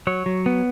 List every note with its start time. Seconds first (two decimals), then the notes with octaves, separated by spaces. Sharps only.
0.07 F#3 C#5
0.26 F#3
0.46 B3